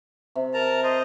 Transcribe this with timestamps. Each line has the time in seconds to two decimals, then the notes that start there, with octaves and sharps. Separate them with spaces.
0.35 C3
0.54 A#4 A5 A#5
0.84 C5 D#5